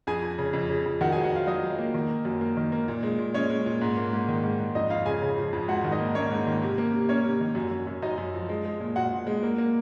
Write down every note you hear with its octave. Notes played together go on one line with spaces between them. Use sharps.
F2 G#4 G#5
F2
C#3
F2
C#3
F2
D#3 F#4 F#5
G#4 G#5
F#3
F#4 F#5
F#3 F4 F5
F#3 D#4 D#5
F#3
A#3
D#3
A#3
F#2
A#3
D#3
A#3
A#2
G#3
A#2
G#3 C#4 C#5
G#3
A#2
G#2
A#3
G#2
D#3
G#2
G#2
F2 D#4 D#5
F2 F4 F5
C#3 G#4 G#5
C#3
F3
F2
G#2 F#4 F#5
D#3
D#4 D#5
A#3
A#3 C#4 C#5
G#2
D#3
C3
A#3
C3
A#3 C#4 C#5
C3
D#3
F#2
F#2
F#2
F#2 D#4 D#5
F#2
F3
G#3
G#3
A#2
A#2 F#4 F#5
A#2
G#3
A#3
A#3